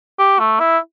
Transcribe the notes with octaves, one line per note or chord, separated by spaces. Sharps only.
G4
A3
E4